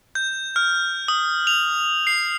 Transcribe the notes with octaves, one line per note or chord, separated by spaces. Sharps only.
G6
F6
D#6
F7
C7